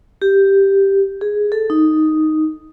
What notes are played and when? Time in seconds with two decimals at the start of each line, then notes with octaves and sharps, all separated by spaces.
0.22 G4
1.21 G#4
1.52 A4
1.70 D#4